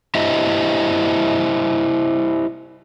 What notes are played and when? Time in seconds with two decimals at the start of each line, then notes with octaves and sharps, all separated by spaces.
0.15 E4 G4 C5 D#5 E5